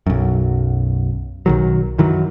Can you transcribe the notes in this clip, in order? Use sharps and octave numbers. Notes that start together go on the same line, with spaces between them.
B1 F#2
B1 D#3 F#3
F#2 D#3 E3 F#3